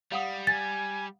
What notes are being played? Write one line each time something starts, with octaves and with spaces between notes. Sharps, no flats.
G3 F5 F#5 D#6
G#5 A6